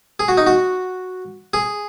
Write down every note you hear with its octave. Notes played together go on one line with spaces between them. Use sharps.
G#4
F#4
D#4
F#4
G#4